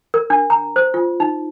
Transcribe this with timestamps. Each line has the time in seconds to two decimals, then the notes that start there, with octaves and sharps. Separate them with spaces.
0.14 A#4
0.30 D4
0.50 A#5
0.76 C5
0.94 F4
1.20 D#4